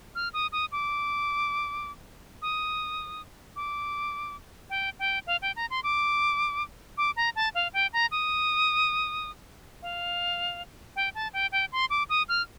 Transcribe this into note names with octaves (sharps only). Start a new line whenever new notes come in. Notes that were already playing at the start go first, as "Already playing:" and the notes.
F6
D#6
D#6
D6
D#6
D6
G5
G5
F5
G5
A#5
C6
D6
D6
A#5
A5
F5
G5
A#5
D#6
F5
G5
A5
G5
G5
C6
D6
D#6
F6